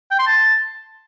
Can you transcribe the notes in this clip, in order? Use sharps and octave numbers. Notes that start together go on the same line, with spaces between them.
G5
C6
A5